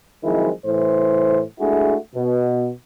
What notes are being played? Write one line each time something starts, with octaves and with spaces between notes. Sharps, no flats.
D#3 F3 F#3 G#3 C4 E4
A2 E3 C5
G#3 A3 D4 E4 F#4 G#4
B2